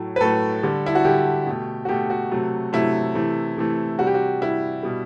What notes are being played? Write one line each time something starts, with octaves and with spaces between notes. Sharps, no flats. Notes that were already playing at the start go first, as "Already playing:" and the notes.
Already playing: A2 F#3 A3
B4
A2 F#3 A3 A4
D3 G3
E4
F#4
D3 G3 G4
B2 A3
F#4
B2 A3 G4
F#4
C3 F#3 A3
C3 F#3 A3 E4
C3 E3 A3
C3 E3 A3
C3 G3 F#4
G4
F#4
C3 G3 E4
B2 G3